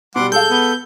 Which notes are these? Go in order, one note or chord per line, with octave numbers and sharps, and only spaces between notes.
B2 G3 F#5 C6 D6
G#3 A4 F5 G6
B3